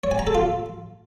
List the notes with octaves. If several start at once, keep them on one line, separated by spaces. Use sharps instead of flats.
C#5
G#5
A#5
A4
F4